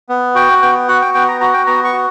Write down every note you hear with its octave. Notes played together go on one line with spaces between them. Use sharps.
B3
F#4 G5
B3 G5
F#4 F#5
G5
B3 G5
A#5
F#4 A#5
G5
B3 A#5
C#6
F#4